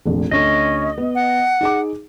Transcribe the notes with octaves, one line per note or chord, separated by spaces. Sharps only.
F1 A#1
D2 C#4 D#5
B3
F#5
D#4 G#4 D6